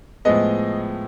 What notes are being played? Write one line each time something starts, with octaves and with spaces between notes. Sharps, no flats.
A2 F3 G#3 B3 D#5